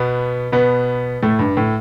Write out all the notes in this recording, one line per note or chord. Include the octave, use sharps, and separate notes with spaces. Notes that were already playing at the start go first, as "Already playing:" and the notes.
Already playing: B2 B3
B2 B3
A2 A3
G2
A2